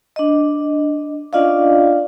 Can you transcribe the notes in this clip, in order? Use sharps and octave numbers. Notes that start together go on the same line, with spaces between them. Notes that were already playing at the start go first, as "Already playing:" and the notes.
D4 D#5
C#4 D4 F4 D5 D#5 F5